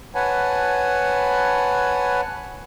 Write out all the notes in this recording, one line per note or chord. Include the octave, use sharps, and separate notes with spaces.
B4 C#5 F#5 G#5 A5 B5